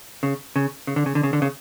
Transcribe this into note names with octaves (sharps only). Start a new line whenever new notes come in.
C#3
C#3
C#3
D3
C#3
D3
C#3
D3
C#3